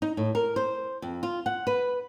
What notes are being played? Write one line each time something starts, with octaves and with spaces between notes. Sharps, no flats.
D#4
A2
A#4
C5
F2
F4
F#5
B4